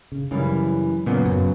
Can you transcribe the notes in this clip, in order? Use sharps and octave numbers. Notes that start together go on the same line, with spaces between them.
C#3
F#2 C#3 E3 G3
A#2 C#3 F#3 B3
F#2